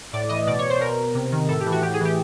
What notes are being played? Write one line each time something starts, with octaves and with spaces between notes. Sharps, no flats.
A2 D5
E3 D#5
B2 D5
C#5
C5
B2 A#4
C3
D#3
A2 A4
G4
E3
F#4
A2 G4
G#4
E3 G4